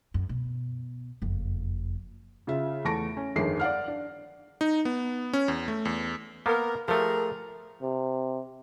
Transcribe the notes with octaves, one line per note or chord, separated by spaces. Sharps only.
F#2
B2
F#1 F2
C#3 F4 E5
E2 A3 A5 C#6 A#6 D7
C#4
G1 F2 D#3 G#4 C7
D5 F5 F#5 F6
D4
D#4
B3
C#4
E2
A3
E2
A#3 B3 A#4
F3 A3 G4 G#4 A#4
C3